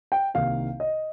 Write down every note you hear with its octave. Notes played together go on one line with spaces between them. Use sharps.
G5
C2 C3 D#3 A#3 D#4 F5
D#5